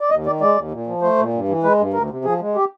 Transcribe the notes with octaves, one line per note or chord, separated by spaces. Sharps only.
D5
D#2 D#5
D#3 D5
G#3 D5
D#2
A#2
F3
A3 C5
A#2
G2
E3
G#3 B4
G2
D2 A#4
C3
F3 G#4
G#3
G4